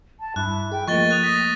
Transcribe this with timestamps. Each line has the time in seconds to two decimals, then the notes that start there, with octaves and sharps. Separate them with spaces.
0.20 A5
0.36 G2 E4 F#6
0.72 G#4 G5
0.88 F3 A3 A#3 D#5 C#6 A6 G7
1.11 D#6 F#6 F7
1.23 A#6 B6